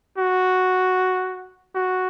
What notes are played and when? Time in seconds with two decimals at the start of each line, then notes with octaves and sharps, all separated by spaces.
0.18 F#4
1.75 F#4